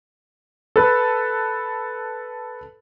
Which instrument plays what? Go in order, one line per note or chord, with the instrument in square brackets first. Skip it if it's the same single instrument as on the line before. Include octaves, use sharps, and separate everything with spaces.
[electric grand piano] A4 B4